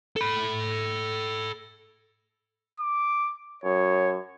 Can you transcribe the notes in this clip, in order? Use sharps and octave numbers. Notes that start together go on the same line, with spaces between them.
A4 B5
D6
F#2 C#5